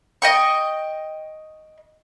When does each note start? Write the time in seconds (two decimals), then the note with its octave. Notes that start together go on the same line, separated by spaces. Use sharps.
0.22 D#5 G5 C#6